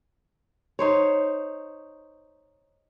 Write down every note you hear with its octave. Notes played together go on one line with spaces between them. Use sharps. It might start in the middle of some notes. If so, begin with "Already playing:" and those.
D#4 C5 C#5